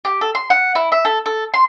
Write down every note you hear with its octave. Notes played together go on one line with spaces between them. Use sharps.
G4
A4
C6
F#5
E4
E5
A4
A4
C6